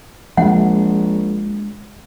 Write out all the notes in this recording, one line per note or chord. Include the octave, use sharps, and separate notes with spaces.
A#1 F3 G#3 F#5